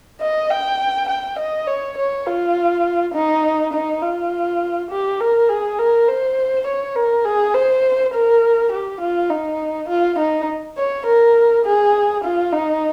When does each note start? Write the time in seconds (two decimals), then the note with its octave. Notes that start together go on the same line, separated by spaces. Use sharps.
0.21 D#5
0.50 G5
1.09 G5
1.39 D#5
1.67 C#5
1.98 C#5
2.26 F4
3.14 D#4
3.73 D#4
4.03 F4
4.91 G4
5.20 A#4
5.49 G#4
5.79 A#4
6.08 C5
6.67 C#5
6.96 A#4
7.25 G#4
7.54 C5
8.14 A#4
8.72 G4
9.01 F4
9.30 D#4
9.89 F4
10.19 D#4
10.77 C#5
11.06 A#4
11.65 G#4
12.24 F4
12.53 D#4